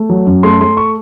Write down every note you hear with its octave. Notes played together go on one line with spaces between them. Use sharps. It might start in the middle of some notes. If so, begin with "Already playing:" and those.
Already playing: A3
F#3
F#2
A3 C6
A3 C6
C#6